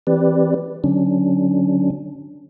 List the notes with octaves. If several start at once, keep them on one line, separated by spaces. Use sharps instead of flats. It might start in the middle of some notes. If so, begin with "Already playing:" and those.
E3 C4 G4 B4 D5
D3 F#3 C#4 D4